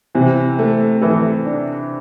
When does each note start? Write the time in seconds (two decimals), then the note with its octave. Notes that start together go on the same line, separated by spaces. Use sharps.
0.15 C3 E3
0.59 A3
1.02 E3 A4
1.46 D4